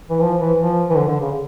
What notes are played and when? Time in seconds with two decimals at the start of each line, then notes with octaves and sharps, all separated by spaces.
0.10 E3
0.21 F3
0.40 E3
0.58 F3
0.90 E3
0.96 D3
1.08 D3
1.21 C#3